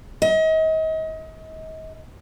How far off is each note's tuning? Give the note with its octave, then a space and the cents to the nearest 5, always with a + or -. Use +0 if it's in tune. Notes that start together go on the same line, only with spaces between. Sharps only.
D#5 +35